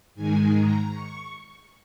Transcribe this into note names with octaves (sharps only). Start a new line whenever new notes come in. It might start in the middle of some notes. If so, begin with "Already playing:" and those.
G#2 D#3 G#3 G#5
A#5
C#6